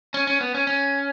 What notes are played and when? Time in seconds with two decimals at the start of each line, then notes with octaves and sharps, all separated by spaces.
0.14 C#4
0.27 C#4
0.41 B3
0.54 C#4
0.67 C#4